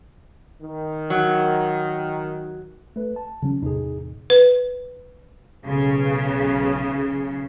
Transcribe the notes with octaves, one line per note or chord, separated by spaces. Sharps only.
D#3
F#3
A3 B4
A5
C#3 F#3 C#4
E2 A2 C3 D#4 G#4
B4
B1 C#3